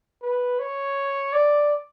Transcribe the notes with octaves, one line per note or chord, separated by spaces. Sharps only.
B4
C#5
D5